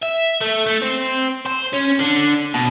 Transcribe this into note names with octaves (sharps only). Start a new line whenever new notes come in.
E5
A3
A3
C4
C5
C#4
D3
B2